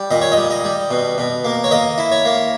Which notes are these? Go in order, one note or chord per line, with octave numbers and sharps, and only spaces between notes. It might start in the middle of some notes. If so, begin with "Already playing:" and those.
Already playing: G3
A#2 D#5
C#5
D#5
G3
D#5
G3
B2
B2
A#3
C#5
A#3 D#5
E4
C#5
A#3